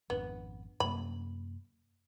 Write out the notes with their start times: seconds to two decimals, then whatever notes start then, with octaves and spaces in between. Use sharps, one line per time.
0.10 G#1 F2 B3 D4
0.80 F#2 C3 A#3 B5